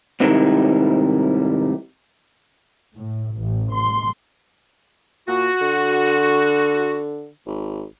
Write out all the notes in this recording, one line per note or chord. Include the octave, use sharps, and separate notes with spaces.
G#2 C3 D#3 G3 E4
A2
A1
C6
A#2 F#4
D3
G#1